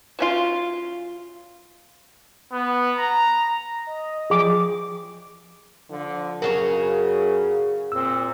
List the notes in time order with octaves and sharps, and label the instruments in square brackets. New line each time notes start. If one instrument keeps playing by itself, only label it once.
[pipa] F#3 C#4 F4
[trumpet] B3
A#5
[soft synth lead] D#5
[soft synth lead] F3 [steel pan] G#4 D6
[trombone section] D3 F3
[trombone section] F#2 C#3 [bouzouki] F#4 G#4 C#5 [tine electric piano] A#4
[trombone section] A#2 C4 [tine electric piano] E6